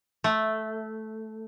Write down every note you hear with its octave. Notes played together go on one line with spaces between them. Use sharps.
A3